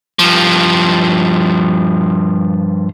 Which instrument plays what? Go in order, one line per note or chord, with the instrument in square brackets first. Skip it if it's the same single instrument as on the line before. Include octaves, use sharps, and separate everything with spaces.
[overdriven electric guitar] G2 F3